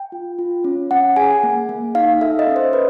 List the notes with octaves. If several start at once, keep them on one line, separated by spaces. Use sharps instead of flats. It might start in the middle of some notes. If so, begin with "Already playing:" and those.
Already playing: G5
F4
F4
C#4
C#4 F#5
G#4 G#5
A#3
A#3
D#4 F5
A4 E5
D#5
C#4
C5
C#4 B4